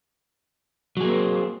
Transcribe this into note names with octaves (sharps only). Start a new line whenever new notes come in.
F#3 A#3 C4 G#4